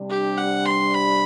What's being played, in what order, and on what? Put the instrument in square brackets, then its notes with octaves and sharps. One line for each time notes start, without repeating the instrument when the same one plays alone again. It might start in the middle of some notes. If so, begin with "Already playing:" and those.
Already playing: [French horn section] C3 G3 D4
[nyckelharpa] G4
F#5
C6
B5